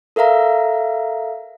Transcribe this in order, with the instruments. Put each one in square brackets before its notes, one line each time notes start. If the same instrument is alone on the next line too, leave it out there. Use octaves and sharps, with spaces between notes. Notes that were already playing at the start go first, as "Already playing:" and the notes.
[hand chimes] A4 A#4 E5 F5 A#5